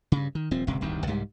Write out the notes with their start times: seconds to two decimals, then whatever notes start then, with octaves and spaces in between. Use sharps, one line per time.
0.12 G2 C#3
0.35 D#3
0.51 D#1 F3 C4
0.67 D1 G1 C#2 C3
0.81 D1 C2 G2 D#3
1.07 C2 G#2 G3